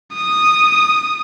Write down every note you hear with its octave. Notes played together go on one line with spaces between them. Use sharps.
D#6